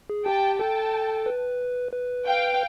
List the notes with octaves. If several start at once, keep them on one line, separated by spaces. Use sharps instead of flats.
G#4
G4 G5 A5
A4 G5 A5
B4
B4
F5 G5